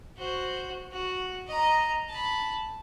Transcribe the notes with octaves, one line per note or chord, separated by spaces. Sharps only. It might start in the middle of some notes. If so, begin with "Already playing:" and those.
F#4 C5
F#4
D#5 A#5
A5 B5